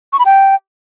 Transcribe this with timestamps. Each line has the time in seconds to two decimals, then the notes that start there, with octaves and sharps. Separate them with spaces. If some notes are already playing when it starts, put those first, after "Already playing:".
0.13 C#6
0.19 B5
0.26 G5